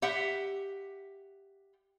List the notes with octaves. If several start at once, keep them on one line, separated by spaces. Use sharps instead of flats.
G4 E5 F#5